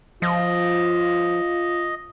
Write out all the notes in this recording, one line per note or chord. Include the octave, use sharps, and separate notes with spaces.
F3 F4 D#5